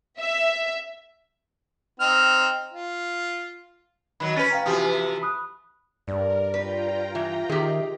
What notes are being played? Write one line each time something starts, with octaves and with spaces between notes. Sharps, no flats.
E5
C4 D#4 F6
F4
D#3 F#3 B5
C#4 B4 A6 D#7
F5 G5 A#5
C3 E3 F3 F#4 G4 D#6
B5 D#6 F#6
G2 A#4 D5
F4 B4 G5 A#5
E3 E5
D#3 G4 G#4